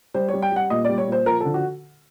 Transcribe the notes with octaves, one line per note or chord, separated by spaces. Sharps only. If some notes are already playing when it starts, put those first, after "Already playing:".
G3 C5
C#5
G3
G5
G3 F#5
A#2 D#5
G3 D5
C#5
A#2 C5
F3 A#4
D3 A4
F#4